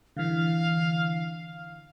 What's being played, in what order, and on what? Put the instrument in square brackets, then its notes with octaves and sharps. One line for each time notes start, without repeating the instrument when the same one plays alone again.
[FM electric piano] D3 E3 [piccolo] F5